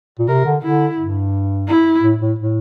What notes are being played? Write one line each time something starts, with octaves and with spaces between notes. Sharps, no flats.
A#2
C3 A#4
D3
D3 E4
G2
E4
A2
A2
A2